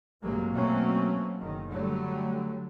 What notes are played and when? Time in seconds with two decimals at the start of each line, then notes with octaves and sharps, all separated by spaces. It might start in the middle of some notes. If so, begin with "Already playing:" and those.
0.22 A1 G2 C3 F#3 G#3 A#3
0.52 B2 F#3 A3 A#3 C4 C#4
1.38 F#1 D#3
1.70 D3 F#3 G3 A3